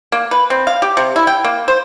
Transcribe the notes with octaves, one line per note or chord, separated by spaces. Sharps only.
A#3
B4
C4
F5
G4
C3
E4
G5
A#3
C5